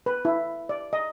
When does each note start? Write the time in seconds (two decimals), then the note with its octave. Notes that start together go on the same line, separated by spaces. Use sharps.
0.06 B4
0.25 E4
0.69 D5
0.93 D#5